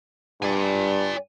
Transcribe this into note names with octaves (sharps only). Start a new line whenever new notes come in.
G2 D5 G#5